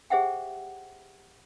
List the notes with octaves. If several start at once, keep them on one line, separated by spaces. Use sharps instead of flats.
G4 G#4 C5 E5 F#5 G5